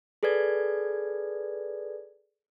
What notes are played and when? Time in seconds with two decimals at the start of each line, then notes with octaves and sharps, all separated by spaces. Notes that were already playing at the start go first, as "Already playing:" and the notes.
0.23 G#4 A4 B4 D5 G#6